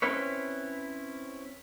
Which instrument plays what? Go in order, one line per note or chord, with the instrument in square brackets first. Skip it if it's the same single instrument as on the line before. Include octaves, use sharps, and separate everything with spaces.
[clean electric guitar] C4 C#4 E4 B4 C#5